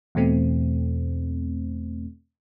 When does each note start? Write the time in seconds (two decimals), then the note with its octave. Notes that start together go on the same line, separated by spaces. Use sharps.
0.15 E2 B2 A3 C4